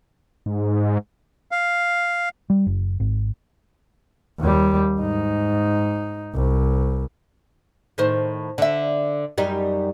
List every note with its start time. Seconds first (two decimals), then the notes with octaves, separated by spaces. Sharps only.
0.46 G#2
1.51 F5
2.50 G3
2.67 F#1
3.00 G#1
4.40 D#2 G3
5.00 G#2 D#4
6.35 C2
7.98 A2 D#3 C5
8.58 D3 E5
9.38 F#2 G3 D#4